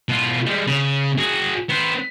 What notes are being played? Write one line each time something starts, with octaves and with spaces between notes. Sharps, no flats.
B2 F4
G3 G#3
C#3
F#4 G#4
B3 C5